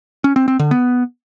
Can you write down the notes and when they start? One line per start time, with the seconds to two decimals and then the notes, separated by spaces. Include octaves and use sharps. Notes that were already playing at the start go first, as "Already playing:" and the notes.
0.24 C#4
0.36 C4
0.48 C4
0.59 D3
0.71 B3